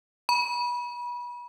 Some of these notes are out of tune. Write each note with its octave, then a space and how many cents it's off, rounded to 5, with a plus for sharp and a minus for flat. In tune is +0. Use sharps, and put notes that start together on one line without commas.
B5 -30